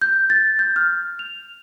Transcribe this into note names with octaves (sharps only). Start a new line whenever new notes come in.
G6
A6
G6
F6
F7